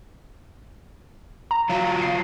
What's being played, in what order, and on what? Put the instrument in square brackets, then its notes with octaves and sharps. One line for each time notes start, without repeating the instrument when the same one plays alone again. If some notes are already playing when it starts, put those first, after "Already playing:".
[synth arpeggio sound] A#5
[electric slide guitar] F#3 F4
[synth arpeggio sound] C7